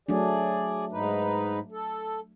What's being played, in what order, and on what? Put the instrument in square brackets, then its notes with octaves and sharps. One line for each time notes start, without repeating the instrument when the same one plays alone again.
[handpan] F#3 A3 D4 [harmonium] G#4 D5
[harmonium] G#2 D#4 B4
A4